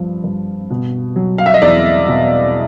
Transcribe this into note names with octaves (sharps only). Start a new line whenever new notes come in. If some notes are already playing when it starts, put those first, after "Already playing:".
Already playing: G2 F3
G2
B2
F#3
F5
E5
D#5
E2 D5
B2